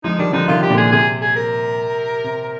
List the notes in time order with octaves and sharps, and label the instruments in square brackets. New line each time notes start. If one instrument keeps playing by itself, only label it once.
[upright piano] F3 G#3 [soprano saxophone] D#4
[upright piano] D#3 G3 [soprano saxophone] D4
[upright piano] D3 F3 [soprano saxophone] D#4
[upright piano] C3 D#3 [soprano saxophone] F4
[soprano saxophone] G4
[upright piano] A#2 D3
[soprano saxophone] G#4
[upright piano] C3 [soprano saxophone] G#4
[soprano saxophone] G#4
A#4
[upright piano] C3